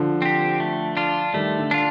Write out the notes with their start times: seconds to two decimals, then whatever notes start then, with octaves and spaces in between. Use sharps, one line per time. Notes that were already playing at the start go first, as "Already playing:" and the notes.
Already playing: D3 F3
0.22 C4 G4
0.60 A3
0.97 D4 F4
1.34 D#3 G3 A3
1.59 D3
1.71 D4 F4